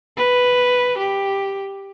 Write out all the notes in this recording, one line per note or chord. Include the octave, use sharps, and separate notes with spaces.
B4
G4